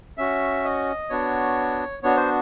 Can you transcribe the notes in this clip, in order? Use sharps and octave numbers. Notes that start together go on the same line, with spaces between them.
C#4 F#4 E5
D#5
B3 D4 F#4 C#5
B3 D4 F#4 C#5
C5